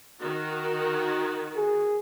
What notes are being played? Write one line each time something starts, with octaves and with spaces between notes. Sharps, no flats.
D#3 F#4
G#4